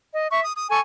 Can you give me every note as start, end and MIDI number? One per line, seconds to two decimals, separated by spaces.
0.13 0.26 75
0.31 0.41 76
0.31 0.41 85
0.43 0.52 87
0.55 0.67 87
0.69 0.79 69
0.69 0.79 80
0.69 0.79 85